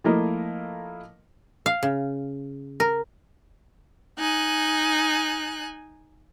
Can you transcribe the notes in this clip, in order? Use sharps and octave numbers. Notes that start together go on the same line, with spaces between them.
F3 A3 A#3 E4 A#4 D#5
F5
C#3
A#4
D#4 G#5 F#6